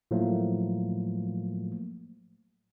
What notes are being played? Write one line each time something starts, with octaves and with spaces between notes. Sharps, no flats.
A2 F3 F#3 A3 A#3